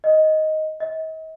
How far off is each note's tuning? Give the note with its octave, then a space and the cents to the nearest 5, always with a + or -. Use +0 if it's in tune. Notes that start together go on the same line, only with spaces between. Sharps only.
D#5 +5
D#5 +40